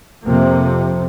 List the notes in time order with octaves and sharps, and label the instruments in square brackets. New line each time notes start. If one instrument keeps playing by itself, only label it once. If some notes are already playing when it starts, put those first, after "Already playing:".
[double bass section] F2 C3 A#3